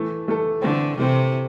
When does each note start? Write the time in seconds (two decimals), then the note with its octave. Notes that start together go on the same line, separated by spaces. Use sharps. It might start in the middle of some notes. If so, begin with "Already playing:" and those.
Already playing: E3 A3 E4 A4
0.27 E3 A3 E4 A4
0.62 D3 E3 A3 C4
0.97 C3 E3 A3 C4